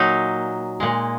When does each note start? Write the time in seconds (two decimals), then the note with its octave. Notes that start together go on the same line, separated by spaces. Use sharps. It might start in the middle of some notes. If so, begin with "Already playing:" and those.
Already playing: A#2 F#3 D#4
0.80 A#2 G#3